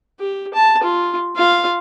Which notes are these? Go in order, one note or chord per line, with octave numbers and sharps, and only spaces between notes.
G4
A5
F4
F4 F5